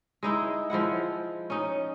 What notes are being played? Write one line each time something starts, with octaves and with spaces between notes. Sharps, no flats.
G#3 D#4 E4
F3 G#3 E4 F#5
C#4 D#4